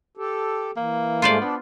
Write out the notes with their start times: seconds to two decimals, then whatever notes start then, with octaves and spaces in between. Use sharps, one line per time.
0.17 G4 A4
0.77 E3 A#3
1.22 G#2 G#3 A3 F4 C5 D5
1.41 B3 D4